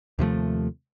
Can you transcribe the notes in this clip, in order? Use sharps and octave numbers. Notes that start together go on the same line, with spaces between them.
D#2 C3 F3 A3